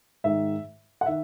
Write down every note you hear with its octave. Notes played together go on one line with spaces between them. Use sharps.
G#2 D#3 E5
F#5
D#3 E5